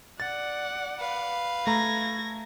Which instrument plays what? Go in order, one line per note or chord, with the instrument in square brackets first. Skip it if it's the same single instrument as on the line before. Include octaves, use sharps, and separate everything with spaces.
[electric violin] D5 F#5 [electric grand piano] A6
[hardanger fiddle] B4 F5
[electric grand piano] A3 A#5 [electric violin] G#6 A#6